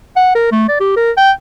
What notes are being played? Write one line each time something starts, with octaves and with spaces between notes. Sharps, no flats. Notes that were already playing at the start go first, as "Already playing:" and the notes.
F#5
A#4
A3
D5
G4
A#4
G5